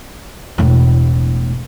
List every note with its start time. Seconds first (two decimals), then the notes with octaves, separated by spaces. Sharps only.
0.58 E1 A2